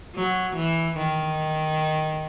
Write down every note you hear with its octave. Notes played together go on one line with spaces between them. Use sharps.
F#3
E3
D#3